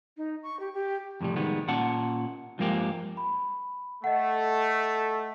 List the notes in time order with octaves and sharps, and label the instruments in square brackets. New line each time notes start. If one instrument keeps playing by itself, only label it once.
[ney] D#4
C#6
G4
G4
[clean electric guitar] F2 A2 C3 G3
D#3 G3 G#3 B3
A#2 C#4 F#5 A5
G2 F3 G#3 A#3 C4 G4
[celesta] B5
[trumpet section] A3 [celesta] D#5 F#5